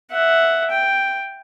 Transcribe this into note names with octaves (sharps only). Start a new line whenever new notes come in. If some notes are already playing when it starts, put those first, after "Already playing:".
E5 F#5
G5